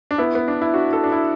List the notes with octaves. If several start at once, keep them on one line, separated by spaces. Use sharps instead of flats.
D4
B3 E4
B3
D4
E4
D4 F#4
E4 A4
D4
E4